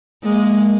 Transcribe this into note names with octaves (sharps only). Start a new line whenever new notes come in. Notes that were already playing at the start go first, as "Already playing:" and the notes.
G#3 A#3